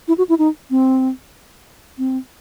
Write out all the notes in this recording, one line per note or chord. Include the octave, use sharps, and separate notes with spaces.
E4
F#4
E4
D#4
C4
C4